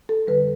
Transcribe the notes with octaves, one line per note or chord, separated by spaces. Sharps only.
A4
F2 D3 G3 B4